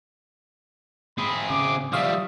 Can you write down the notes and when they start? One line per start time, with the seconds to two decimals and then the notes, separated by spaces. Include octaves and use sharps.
1.18 C4 G#4 B5
1.50 C#3 D6
1.93 F3 G3 E5 F5 C#6 D#6